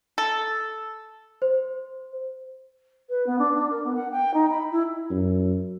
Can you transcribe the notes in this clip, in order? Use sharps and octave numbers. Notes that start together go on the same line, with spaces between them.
A4
C5
B4
B3
D4
D4
A#4
B3
F#5
G5
D#4
B5
E4
F#2